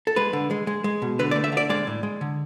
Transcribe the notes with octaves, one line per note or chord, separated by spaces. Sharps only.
A4
G#3 B4
D3
G#3
G#3
G#3
B2
D3 B4
D5
A3
E5
D3
D5
G#3 D5
A2
G#3
D3